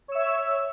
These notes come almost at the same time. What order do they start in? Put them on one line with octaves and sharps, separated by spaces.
C#5 E6 E5